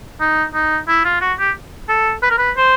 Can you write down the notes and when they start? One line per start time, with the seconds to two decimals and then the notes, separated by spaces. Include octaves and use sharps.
0.20 D#4
0.54 D#4
0.88 E4
1.05 F4
1.21 F#4
1.39 G4
1.89 A4
2.23 B4
2.31 A#4
2.38 B4
2.56 C5